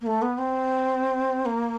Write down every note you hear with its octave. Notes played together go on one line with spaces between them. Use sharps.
A#3
A3
B3
C4
A#3